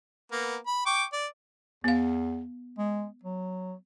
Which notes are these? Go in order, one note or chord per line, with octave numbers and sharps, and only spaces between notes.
A#3 B3
B5
G5 C#6 D6
D5
E2 B3 F5
G#3
F#3